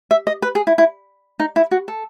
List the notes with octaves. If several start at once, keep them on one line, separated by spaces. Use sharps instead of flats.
E5
D#5
B4
G#4
E4
E4
D#4
E4
F#4
A4